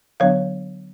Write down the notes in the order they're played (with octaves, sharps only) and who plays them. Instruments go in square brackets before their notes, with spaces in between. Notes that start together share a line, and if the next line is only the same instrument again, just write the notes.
[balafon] D3 F#3 B3 D4 C#5 F5